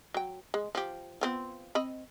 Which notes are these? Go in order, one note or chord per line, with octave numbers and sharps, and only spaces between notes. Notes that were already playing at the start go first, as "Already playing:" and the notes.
F#3 G5
G#3
F3 G4
B3 C4 F4
C4 D#5 B5